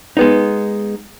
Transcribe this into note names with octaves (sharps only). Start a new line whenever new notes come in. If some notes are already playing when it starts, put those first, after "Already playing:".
G#3 B3 D#4